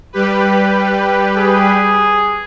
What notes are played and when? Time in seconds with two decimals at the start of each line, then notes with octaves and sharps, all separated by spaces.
0.13 G3 G4 B4
1.38 G#4